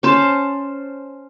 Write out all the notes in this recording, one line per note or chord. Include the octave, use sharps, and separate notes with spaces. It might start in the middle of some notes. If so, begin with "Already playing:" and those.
C#4 C5 A5